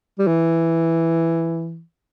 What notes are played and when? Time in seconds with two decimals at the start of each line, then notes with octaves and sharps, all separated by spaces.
0.19 G3
0.27 E3